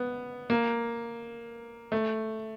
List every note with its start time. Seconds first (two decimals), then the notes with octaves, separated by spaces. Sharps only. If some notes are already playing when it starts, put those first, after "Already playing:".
Already playing: B3
0.50 A#3
1.92 A3